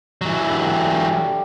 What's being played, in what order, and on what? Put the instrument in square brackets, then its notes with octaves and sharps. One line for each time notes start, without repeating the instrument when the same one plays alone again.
[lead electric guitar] E3 F#3
[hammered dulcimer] D3 G3